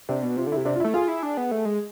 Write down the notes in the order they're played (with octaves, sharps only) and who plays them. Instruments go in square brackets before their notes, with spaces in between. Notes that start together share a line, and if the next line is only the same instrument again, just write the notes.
[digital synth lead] C3 [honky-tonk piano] D4
[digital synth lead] B2
[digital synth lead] C3 [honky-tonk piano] F4
[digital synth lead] D3
[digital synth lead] C3 [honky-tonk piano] E4
[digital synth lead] C3 [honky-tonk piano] D4
[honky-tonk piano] F4
[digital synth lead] A3 [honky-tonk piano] E4
[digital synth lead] F4 [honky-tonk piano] G#4
[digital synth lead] E4
D4
B3
A3
G#3